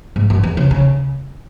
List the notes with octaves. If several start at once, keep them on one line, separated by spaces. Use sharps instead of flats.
G#2
F#2
E2
C#3
C#3